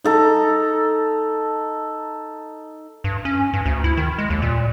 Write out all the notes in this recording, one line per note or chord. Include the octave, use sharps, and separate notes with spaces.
D#4 A4 A#5
G2
C#4
G2
D2
E4
D#3
G#3
D#2
A#2